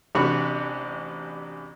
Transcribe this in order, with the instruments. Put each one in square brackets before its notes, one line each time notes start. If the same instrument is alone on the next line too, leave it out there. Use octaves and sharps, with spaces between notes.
[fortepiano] A1 C3 D4 F#4 B5 C#6